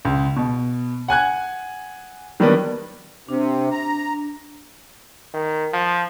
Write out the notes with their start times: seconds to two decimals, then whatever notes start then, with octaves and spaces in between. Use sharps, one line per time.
0.05 C#2
0.36 B2
1.08 F#5 G#5 F#6 G#6
2.40 D#3 F#3 G3 A#3 B3 D4
3.29 C3 D4
3.72 A#5
5.34 D#3
5.73 F3